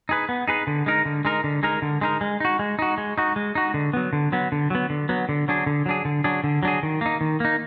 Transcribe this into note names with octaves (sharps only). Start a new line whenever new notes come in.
D#4 G#4 B4
B3
D#4 G#4 B4
D3
G#3 D#4 A#4
D3
G#3 D#4 A#4
D3
G#3 D#4 A#4
D3
G#3 D#4 A#4
G#3
D#4 F#4
G#3
D#4 F#4
G#3
D#4 F#4
G#3
D#4 F#4
D3
F#3 B3
D3
F#3 B3
D3
F#3 B3
D3
F#3 B3
D3
F#3 D4 G#4
D3
F#3 D4 G#4
D3
F#3 D4 G#4
D3
F#3 D4 G#4
D#3
A#3 D#4
D#3
A#3 D#4